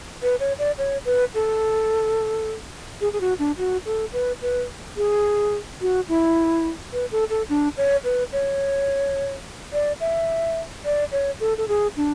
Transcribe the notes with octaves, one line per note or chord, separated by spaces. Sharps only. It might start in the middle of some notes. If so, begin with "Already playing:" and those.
B4
C#5
D5
C#5
B4
A4
G#4
G#4
F#4
D4
F#4
A4
B4
B4
G#4
F#4
E4
B4
A4
A4
D4
C#5
B4
C#5
D5
E5
D5
C#5
A4
A4
G#4
D4